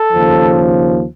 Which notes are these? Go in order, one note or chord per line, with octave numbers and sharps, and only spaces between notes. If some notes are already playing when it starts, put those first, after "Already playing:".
Already playing: A4
D#2 C#3 F3